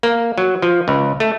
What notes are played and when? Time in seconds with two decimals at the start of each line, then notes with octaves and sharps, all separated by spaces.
0.03 A#3
0.38 F#3
0.62 F3
0.88 C#2
1.20 A3